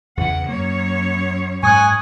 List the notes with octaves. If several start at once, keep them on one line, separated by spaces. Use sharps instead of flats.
E2 C#3 E3 F#5
F#2 A#3 C#5
G#2 G#5 C#6 D#6 F#6